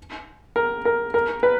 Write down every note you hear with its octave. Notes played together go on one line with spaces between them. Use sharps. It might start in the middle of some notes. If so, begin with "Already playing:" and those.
A#4
A#4
A#4
B4